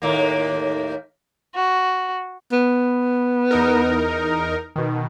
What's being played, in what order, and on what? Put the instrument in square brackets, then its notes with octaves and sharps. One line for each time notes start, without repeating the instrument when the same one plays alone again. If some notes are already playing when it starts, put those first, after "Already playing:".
[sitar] D#2 A2 A#3
[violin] F#4
[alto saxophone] B3
[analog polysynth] E2 D#4 A#4
B2 D#3